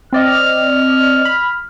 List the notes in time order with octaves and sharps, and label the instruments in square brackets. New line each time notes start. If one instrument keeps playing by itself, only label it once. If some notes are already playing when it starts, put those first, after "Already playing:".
[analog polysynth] C4 D5 D#5 [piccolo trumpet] F6
[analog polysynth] B5